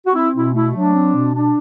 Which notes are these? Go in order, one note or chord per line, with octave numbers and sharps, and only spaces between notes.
F#4
C4 E4
B2 E4
A3 E4
F#3 D4
C4
B2
D4